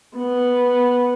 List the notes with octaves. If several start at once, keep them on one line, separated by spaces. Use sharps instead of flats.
B3